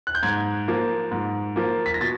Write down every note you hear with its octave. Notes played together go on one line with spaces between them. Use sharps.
F#6
G6
G#2 G#6
F3 A#3
G#2
F3 A#3
B6
A#6
B2 A6